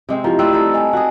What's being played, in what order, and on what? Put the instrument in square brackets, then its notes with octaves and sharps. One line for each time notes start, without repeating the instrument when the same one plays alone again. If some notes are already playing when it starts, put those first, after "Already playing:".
[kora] C3 G#3 C4
[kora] F3 [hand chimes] E4 G4 A#5
[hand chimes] A3 E6 [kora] C4 B4 D5
[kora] G3 D#4 A4
[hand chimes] D#5 G#5 A5
[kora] F#4 G#4